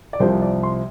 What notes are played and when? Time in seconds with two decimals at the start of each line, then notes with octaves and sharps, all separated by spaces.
0.13 D5
0.20 C2 C3 F3 C5
0.42 D5
0.63 C6